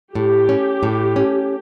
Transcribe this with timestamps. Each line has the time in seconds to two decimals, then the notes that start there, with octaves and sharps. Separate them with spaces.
0.15 A2 G4
0.49 C#4
0.83 A2
1.16 C#4